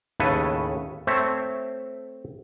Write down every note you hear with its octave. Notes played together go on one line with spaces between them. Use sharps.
D#2 A2 C#3 A4 B4 G#5
A3 C4 C5 C#5 E5